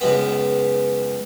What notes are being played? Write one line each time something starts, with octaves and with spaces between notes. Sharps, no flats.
C#2 F#2 B3